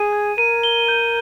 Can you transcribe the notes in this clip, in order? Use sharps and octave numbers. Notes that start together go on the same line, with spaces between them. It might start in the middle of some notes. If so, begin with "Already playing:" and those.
Already playing: G#4 D#7
G#6
A#4 D#7
G7
G6